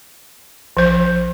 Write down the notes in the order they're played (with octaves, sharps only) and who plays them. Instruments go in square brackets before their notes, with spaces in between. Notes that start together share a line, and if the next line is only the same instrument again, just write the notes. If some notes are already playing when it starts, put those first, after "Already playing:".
[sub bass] A#1 [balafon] F3 C5